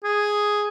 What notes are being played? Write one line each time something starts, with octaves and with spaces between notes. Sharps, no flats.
G#4